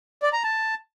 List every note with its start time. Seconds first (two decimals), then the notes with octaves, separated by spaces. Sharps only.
0.23 D5
0.33 A#5
0.43 A5